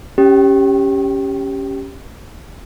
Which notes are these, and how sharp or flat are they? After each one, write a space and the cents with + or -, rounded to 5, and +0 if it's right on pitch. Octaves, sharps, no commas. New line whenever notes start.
C#4 +0 G4 +0